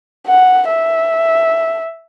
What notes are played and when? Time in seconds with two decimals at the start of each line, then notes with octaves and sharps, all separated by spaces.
0.27 F#5
0.69 E5